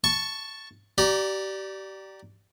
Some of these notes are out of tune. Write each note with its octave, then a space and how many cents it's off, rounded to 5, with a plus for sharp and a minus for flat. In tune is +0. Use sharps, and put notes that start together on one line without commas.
A5 +0 C#6 +0
G4 -30 D5 +0 A#5 +0